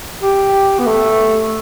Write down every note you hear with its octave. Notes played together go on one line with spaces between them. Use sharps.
G4
B3
A3